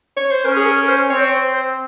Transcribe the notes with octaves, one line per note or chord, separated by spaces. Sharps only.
C#5
C5
C#4 A#4
G#4
A#4
A#4
C5
C4 C#5
C#5
C5
C5